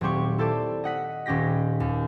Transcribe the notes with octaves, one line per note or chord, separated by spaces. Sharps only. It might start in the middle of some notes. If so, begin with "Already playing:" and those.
D#1 F#3 C4 G4 C#6
E4 A4 C5 D5
D#5 F#5 B6
D#1 C#4 G4 A#6 B6
D#2